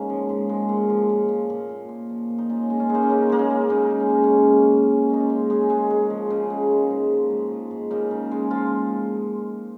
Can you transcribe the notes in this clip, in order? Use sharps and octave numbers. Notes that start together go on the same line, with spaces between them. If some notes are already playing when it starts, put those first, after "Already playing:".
Already playing: G#2 G#3 A#3 C#4 D#4
F3
G#2
G#3
A#2
F3
A#2
A#2
A#2
A#2
A#2
F3
A#2
D#4
A#2 C#4 F4
G#3
C#4 F4
G#3
A#3 D#4
C#4
C#3 A#3
G#3 A#3
C#4
C#3
C#3 A#3 D#4
G#3
C#4
G#3
C#4
A#2 A#3
G#3
A#3
G#3
A#2 C#4
G#3 D#4
C#4 F4
G#3
G#3 D#4 G#4
G#3
G#3
F3
C#3
G#3
F3 A#3 D#4
G#2
F3
G#2
F3
G#2
C#3 A#3 D#4
C#3
G#3
F3 F4